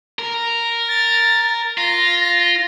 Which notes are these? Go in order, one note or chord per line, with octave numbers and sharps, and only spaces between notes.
A#4
A6
F4 A#6